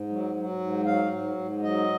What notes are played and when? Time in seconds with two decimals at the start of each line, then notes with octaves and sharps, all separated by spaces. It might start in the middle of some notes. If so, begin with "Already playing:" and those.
Already playing: G#2
0.09 F#3
0.35 F#3
0.60 G#2
0.86 F#3 F5
1.11 G#2
1.37 G#2
1.62 F#3 D#5